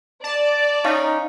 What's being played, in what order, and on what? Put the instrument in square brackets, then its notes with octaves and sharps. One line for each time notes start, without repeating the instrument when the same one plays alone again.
[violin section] D5 [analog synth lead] A5
[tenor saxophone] C#4 [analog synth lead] D#4 [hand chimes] F5